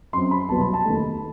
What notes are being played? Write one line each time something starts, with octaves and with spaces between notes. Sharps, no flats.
F#2 F#3 C4 C6
B5
C2 B2 F#3 B3 A5
B5
A5
D#2 D#3 A3